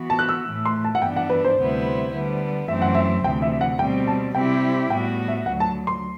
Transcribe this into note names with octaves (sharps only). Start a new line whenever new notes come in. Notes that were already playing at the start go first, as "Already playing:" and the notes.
Already playing: E3 B3 F#4
A5
F#6
E6
A2 E3 A3
C6
A5
F#5
G2 E3 B3 D4 G5
F#5
B4
C5
D2 C3 G3 B3 E4
D3 G3 B3
F#2 E3 A3 C4 E5
F#5
E5
D2 C3 E3 G5
E5
F#5
B2 G3 C4 G5
A5
C3 G3 C4 E4 G4 G5
A2 G3 B3 F#4 G5
E5
D2 D3 F#3 F#5
A5
C6